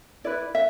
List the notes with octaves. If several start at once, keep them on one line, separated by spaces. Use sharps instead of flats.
E4 B4 D5
E5